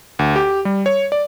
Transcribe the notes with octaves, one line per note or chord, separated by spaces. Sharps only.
D2
G4
G3
C#5
D5